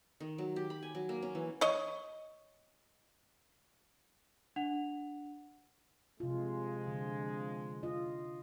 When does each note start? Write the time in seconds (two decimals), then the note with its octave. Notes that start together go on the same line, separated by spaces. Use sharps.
0.20 D#3
0.38 F#3
0.56 G4
0.70 B5
0.83 G#5
0.95 F#3
1.09 A#3
1.22 C#4
1.35 E3
1.61 C#5 D#5
4.56 D4 F#5 F7
6.20 C3 F3 G#3 F4
6.88 D3
7.83 F4 D#5